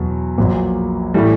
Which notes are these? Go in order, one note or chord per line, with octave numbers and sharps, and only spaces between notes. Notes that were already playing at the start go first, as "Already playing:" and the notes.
Already playing: E2 B2 F#3
A#1 A#2 F#3
A2 E3 G3